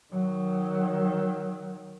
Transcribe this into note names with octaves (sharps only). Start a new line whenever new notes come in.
D#3 F#3